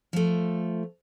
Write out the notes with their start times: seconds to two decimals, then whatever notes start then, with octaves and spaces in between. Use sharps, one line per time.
0.13 F3 A3